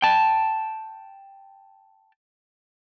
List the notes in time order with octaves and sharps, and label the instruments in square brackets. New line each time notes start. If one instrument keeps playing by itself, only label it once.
[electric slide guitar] G5 A5